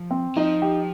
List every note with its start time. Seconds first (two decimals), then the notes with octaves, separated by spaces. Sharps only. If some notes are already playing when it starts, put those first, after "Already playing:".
Already playing: F3
0.11 C4
0.36 F3 D#4
0.62 G4